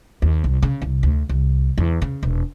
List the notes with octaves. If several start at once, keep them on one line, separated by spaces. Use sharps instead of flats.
D#2
C2
C#3
C2
D2
C2
E2
C#3
E1